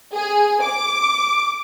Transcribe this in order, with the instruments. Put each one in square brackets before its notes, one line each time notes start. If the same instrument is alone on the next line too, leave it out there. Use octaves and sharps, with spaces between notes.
[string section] G#4
D6